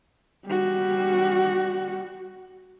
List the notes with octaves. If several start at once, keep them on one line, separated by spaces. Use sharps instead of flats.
G3 F#4